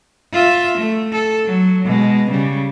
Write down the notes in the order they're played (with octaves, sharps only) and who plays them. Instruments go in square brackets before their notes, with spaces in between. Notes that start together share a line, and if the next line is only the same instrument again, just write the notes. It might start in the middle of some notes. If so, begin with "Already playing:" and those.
[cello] F4 E5
A3
A4
F#3
B2 G#3
C#3 G3